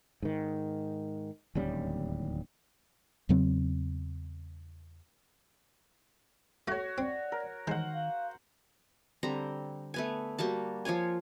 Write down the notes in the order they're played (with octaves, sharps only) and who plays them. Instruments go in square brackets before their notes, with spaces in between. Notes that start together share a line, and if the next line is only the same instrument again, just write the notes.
[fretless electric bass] G#2 D#3
D1 D#2 G3 C#4
E2 C#3 F#3 C4
[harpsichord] A3 [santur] F#4 C#5
[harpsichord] C4 [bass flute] D5
[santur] A#4
[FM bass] D#3 [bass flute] E3 [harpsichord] G#3 [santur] C5 F#5
[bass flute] F5
[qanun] D3 G3 C4 A#5
A3 B3 G#5
G3 A#3 F#4 A5
F3 F4 C#5 G#5